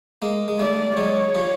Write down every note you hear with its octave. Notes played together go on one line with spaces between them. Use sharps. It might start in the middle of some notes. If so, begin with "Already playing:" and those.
G#3 A#3
G#3
G3 A3 D5
F#3 G#3 C#5
F3 G3